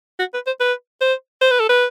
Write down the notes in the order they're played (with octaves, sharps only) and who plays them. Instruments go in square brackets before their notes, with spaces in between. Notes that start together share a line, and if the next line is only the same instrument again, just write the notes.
[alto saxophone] F#4
B4
C5
B4
C5
C5
B4
A4
B4